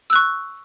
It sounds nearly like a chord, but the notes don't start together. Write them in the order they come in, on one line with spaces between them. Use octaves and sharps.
E6 F#6 C#6